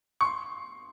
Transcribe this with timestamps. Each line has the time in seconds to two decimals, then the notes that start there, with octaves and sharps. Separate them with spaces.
0.21 C#6
0.25 C6